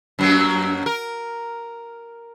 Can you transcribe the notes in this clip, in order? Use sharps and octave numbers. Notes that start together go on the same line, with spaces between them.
F#2 F#3 A#3
A#4